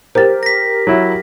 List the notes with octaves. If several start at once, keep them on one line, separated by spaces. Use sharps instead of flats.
G4 A#4 C5 A6
A#6 B6
F#3 E4